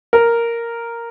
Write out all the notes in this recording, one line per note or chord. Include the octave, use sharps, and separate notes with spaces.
A#4